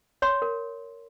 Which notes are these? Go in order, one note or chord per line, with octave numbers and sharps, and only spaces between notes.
C#5 C6
A#4